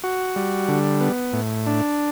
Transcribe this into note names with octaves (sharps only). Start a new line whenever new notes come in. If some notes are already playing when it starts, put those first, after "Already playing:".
F#4
G3
D3
B3
A2
D4